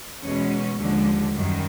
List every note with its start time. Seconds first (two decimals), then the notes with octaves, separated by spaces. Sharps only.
0.23 E2 B2 G#3 C#4
0.79 D#2 D3 F3 G#3
1.33 F#2 D#3 G3